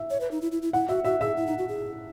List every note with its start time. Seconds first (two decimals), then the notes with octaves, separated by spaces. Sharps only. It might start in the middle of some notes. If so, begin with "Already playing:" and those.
Already playing: E5
0.10 C#5
0.20 B4
0.31 D#4
0.42 E4
0.52 E4
0.62 E4
0.73 E4 F#5
0.88 F#4 E5
1.04 F#4 E5
1.21 G#4 E5
1.37 E4
1.47 D#4
1.58 F#4
1.68 G#4